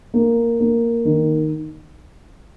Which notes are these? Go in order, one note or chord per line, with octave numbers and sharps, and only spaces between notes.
A#3
A#3
D#3